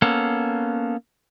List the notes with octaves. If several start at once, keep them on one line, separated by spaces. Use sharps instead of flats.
A#3 B3 C#4 A4